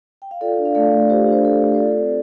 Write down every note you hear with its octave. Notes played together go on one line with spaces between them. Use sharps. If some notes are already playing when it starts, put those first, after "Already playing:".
G5
F5
F4 A4 D5
D4
F5
A3 A4 D5
A3
F4 G4 C5
D4 C5
A3 A4
A3
C5
F4 A4 D5
C4